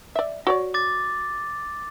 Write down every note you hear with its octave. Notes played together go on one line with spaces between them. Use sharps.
D5 E5
F#4 C#5 D5
D6 A6